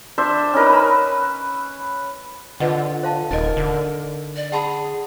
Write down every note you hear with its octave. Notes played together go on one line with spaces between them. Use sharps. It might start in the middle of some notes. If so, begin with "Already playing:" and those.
D4 C5 E5
C#4 D#4 A#4 B4
B4 E6
D3 F4 B4 D#5 F#5
C5 F5 A5
D#1 D#4 A#4 D#5
D3
D5
G#4 F#5 A5 B5